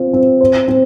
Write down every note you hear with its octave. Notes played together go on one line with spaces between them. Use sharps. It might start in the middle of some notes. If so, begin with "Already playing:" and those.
Already playing: C4 F4
C4
C5
C4